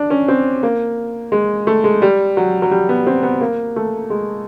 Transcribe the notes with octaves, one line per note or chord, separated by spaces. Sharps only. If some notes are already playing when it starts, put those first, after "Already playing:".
Already playing: D4
C#4
C4
A#3
G#3
A3
G#3
G3
F#3
F#3
G3
B3
C4
B3
A#3
A3
G#3